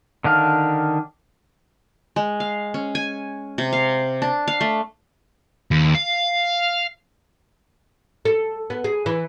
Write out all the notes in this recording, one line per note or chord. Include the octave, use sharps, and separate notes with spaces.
D3 D#3 D4 F5
G#3
F5
C#4
G#5
C3
F5
D4
F5
A3
D#2
F5
A4
B3
G#4
E3